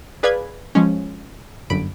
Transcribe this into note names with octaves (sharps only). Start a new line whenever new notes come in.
G#4 B4 D5 F5 B5 G#6
F3 G#3 C#4
G1 F#2 B5 D7